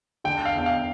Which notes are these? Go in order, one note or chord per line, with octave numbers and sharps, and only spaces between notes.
D3 G5
F5
E2 G5
F5